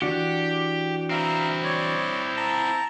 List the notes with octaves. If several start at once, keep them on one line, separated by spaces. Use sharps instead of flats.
E3 D4 F#4 G4
C4 E4 E5 F5 A#5
C#5 D5
A5 A#5